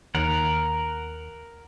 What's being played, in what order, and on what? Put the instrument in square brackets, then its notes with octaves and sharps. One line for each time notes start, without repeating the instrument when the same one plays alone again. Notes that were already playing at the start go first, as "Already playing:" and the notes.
[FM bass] D#2 [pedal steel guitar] A#4 F#5